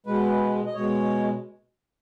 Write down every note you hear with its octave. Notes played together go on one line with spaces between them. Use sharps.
B2 G#3 B4
D#5
B2 G#3 C#5